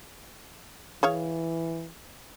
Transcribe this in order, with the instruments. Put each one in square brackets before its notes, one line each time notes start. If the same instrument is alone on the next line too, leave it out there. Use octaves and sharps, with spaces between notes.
[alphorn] E3 [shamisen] G#4 C#5 F5